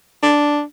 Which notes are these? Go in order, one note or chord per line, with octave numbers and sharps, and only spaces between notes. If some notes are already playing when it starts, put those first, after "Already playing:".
D4